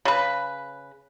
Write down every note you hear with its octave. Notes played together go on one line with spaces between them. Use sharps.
C#3 B4